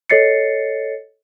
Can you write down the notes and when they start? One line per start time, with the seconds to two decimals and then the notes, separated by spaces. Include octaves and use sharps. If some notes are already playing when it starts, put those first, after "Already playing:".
0.10 A4 C#5 D#5 A6 C7 C#7